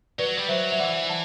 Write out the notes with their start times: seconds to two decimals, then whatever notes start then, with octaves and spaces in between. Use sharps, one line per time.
0.18 F#3 B4 D5
0.38 G3
0.48 F#3 C5 E5
0.72 E5
0.79 E3 D5 F#5
1.09 F#5 A5